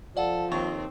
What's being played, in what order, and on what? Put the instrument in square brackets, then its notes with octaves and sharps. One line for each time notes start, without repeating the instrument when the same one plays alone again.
[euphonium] F3 [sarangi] A4 [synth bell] D5 F5 F#5
[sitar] D#2 [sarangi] C4 [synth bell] C#6